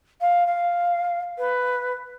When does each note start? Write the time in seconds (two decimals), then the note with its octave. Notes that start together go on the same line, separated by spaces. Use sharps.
0.21 F5
0.47 F5
1.38 B4